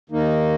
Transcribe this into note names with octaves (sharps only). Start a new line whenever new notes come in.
D#2 D#3 A#3 D#4